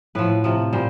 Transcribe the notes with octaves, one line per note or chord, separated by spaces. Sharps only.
A2 F3 B4
C3 F3
A#2 G3 C5